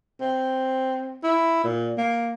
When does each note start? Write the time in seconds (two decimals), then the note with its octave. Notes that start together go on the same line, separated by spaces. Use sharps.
0.21 C4
1.23 E4
1.64 A#2
1.98 A#3